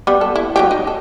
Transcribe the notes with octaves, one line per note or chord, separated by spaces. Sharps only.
G3 B3 B5
A4
E4
F#3 G3 G4
D#4
A4